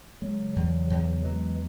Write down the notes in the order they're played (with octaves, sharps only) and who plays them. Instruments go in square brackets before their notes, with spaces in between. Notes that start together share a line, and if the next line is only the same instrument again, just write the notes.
[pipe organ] C#3 F#3 [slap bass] G#3
[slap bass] E2 [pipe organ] C#3 F#3
[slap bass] E2 [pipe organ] C#3 F#3
[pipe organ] E3 G#3 [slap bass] F#3